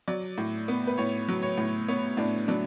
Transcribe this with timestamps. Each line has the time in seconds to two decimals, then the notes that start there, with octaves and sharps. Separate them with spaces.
0.08 F#3 D5
0.38 A2
0.68 B3
0.87 B4
0.98 A2 C#5
1.28 F#3
1.42 C#5
1.58 A2
1.88 B3 C#5
2.17 A2 D4
2.48 F#3 D4